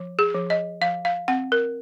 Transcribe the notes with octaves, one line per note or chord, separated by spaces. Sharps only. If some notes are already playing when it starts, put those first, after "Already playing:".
Already playing: F3
G#4
F3
D#5
F3 F5
F5
C4 F#5
A#4